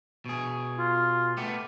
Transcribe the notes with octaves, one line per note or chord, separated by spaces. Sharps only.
B2 G#4
F4
A3 B3 G4